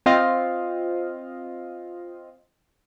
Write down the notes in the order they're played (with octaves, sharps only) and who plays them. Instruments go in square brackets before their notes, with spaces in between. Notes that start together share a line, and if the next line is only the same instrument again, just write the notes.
[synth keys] C4 F4 D#5 F5